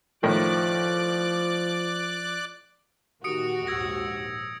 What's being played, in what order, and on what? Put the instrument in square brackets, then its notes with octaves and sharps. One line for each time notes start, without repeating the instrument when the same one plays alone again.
[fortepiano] A2 D#3 [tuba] F3 [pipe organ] D5 D6 F#6
[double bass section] A#2 D#3 [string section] F#4 [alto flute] G4 [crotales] D#6 C#7 D7
[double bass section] A#1 D#2 G#2 [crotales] E6 G#6 A#6